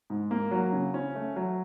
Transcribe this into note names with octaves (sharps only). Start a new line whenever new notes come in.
G#2
A#3
F#3
C#3
C#4
A3
F#3